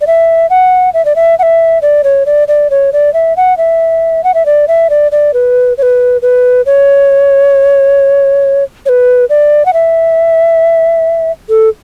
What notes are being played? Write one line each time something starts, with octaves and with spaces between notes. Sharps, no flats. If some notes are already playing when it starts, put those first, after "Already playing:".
D5
E5
F#5
E5
D5
E5
F#5
E5
D5
C#5
D5
D5
C#5
D5
E5
F#5
E5
F#5
E5
D5
E5
D5
D5
B4
C#5
B4
B4
C#5
C#5
B4
D5
F#5
E5
A4